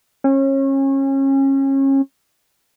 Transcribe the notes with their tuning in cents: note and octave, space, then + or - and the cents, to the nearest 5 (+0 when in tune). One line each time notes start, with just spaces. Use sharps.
C#4 -30